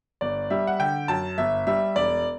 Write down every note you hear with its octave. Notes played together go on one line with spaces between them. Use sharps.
G1 D5
G3 E5
F#5
D3 G5
F#2 A5
G1 E5
G3 E5
E1 D5